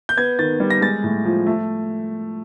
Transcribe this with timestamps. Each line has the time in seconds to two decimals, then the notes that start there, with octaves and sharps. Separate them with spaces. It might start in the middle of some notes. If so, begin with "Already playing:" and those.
0.09 G6
0.17 B3 G#6
0.39 D#3 A6
0.60 G3
0.70 A#6
0.81 G#3 A6
1.04 A2
1.25 F3
1.46 A3